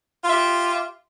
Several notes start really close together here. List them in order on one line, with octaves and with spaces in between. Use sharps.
F4 E5 G4